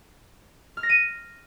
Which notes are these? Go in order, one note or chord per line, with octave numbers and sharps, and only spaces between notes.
F6
A#6
D#7